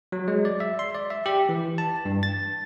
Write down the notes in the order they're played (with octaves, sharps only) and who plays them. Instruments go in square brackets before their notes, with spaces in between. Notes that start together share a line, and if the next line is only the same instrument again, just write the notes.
[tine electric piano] F#3
G#3
D5
E5
C6
D5
E5
G4
E3
A5
G2
A6